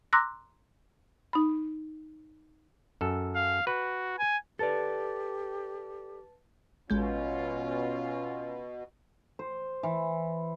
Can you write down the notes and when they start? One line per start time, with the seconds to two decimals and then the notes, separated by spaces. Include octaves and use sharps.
0.13 A#5 C6 D6 E6 F#6 A#6
1.33 D#4 B5
3.01 F#2 A4
3.35 F5
3.67 F#4 B4
4.19 G#5
4.59 G4 A4 B4 D5 A5 A6
6.90 A1 B2 G#3 C#4 F4 G6
9.39 C5
9.83 E3